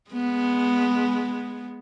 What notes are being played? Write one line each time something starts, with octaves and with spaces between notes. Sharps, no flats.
G#3 B3